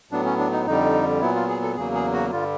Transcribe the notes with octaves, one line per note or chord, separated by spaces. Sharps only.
A2 F#3 B3 D4
C#4
D4
D#4
F2 D3 G3 D#4
A#2 F#3 B3 E4
F4
G#4
A4
E2 C#3 F#3 A#3 G#4
G#4
F#4
G2 D3 G3 F4